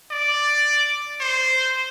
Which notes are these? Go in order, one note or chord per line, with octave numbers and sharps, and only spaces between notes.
D5
C5